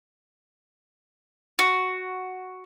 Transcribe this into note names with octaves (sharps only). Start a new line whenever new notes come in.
F#4